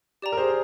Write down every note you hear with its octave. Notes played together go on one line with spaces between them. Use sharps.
G4 D5 G5 A#5
A#4
G#4 C5